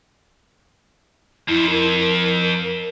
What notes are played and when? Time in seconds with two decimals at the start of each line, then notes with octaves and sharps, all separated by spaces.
1.48 F2 E4
1.70 A#4